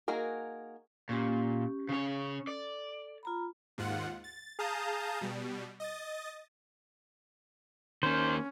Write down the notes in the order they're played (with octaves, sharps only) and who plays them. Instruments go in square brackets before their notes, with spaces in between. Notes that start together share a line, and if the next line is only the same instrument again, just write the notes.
[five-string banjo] A#3 D#4 F#4 G#4 A#4
[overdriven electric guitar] A#2 [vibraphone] C#4 G4
[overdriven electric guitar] C#3 C#5 [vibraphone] C#4
[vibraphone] A4 [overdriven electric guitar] D5
[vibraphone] F4 A#5 B5
[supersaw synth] D#2 G#2 F4 F#5
A6
G#4 F5 A5 A#5 D#6 G6
B2 G3
D#5 D#6 A6
[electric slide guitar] D#3 A#3 [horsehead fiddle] C#4 [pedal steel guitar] C5